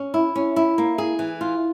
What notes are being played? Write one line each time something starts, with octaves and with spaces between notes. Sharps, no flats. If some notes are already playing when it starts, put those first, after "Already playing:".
Already playing: C#4
E4
C#4
E4
A#3
G#4
E3
F4